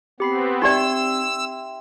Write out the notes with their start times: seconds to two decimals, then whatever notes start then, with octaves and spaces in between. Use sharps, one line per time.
0.20 B3 C4 G4 B5 C7
0.62 C4 D#4 G4 D5 E5 G5 C6 E6